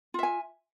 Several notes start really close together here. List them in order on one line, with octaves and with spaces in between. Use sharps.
F4 E5 G#5